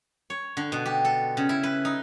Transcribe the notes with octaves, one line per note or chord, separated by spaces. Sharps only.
C#5
D3
B2
G4
A4
C#3
E4
B4
D#4